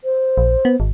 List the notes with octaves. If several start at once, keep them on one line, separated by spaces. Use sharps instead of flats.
C5
A#1
B3
G#1